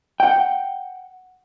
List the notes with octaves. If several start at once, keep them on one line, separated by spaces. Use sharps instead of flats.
F#5 G5